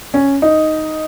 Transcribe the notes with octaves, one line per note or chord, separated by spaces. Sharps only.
C#4
D#4